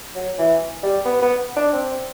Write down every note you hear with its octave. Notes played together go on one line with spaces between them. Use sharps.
F#3
E3
G3
B3
B3
D4
C4